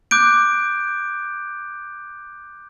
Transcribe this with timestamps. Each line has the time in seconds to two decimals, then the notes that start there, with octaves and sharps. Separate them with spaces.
0.11 D6 F#6 G6 D7